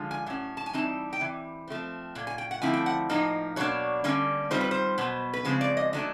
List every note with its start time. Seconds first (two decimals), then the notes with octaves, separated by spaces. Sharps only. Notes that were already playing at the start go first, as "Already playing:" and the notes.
Already playing: D3 F3 G#3 F4
0.11 G#5
0.26 A2 F#3 C#4
0.57 A5
0.66 G#5
0.73 E3 G3 C4 D#4 A5
1.13 G5
1.20 C3 E3
1.68 F3 A3 C4
2.15 A#2 F#3
2.27 G#5
2.38 G5
2.51 F#5
2.62 D3 F3 A3 C4 E4 G#5
2.74 G5
2.86 F#5
3.09 A2 F3 A#3 D#4
3.56 B2 F#3 A#3 D4 C#5
4.04 D3 G3 A#3 C#4
4.51 D#3 G3 C4 F4 C5
4.61 B4
4.71 C5
4.98 B2 F#3 B3
5.34 B4
5.45 C#3 F3 G#3 C4 C5
5.61 D5
5.77 D#5
5.93 D#3 F#3 A3 D4